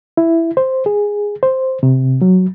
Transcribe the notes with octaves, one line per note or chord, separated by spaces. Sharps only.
E4
C5
G#4
C5
C3
F#3